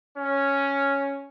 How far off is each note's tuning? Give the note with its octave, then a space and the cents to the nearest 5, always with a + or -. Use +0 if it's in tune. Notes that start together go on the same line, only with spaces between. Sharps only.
C#4 +0